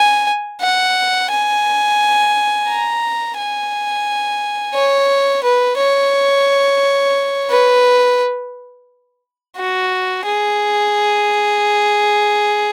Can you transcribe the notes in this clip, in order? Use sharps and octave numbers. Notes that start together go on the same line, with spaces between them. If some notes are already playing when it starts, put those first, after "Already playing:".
Already playing: G#5
F#5
G#5
A#5
G#5
C#5
B4
C#5
B4
F#4
G#4